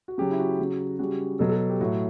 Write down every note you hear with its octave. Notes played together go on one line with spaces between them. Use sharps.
F#4
C#3 F#3 G4
E4
F#4
C#3 F#3
C#3 G3 F#4
B2 F#3 A4
A4
G4
A2 F#3 F#4